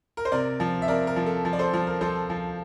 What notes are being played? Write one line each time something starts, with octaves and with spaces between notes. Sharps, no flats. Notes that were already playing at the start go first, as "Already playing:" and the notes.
A#4
C5
C3 A#4 D5
F3
E5
C3 A#4 D5
A#4
F3
A4
F3
D5
A4 C5
F3
A#4
F3 A4 C5
F3